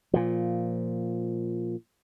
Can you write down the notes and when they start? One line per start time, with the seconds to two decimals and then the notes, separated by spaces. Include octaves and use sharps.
0.14 A#2 F3